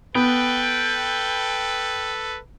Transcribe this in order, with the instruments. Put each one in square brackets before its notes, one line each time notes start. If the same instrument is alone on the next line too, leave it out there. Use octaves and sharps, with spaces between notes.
[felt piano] B3 [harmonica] A4 B4 [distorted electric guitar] G5